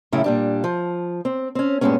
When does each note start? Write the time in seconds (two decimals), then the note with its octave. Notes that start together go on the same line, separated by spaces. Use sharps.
0.13 F#2 A2 C#3 E4
0.24 A#2 G3 D4
0.64 F3
1.25 C4
1.55 C4 C#4
1.81 G2 A#2 C#3 G#3 B3 C#4